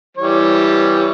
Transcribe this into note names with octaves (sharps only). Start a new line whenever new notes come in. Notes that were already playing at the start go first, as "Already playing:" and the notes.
E3 G3 C#5